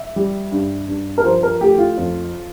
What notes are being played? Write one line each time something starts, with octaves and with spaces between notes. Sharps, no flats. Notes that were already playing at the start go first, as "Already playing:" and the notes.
Already playing: E5
G3
G2
G2
A#4
F3 C5
A#4
A3 G4
F4
F2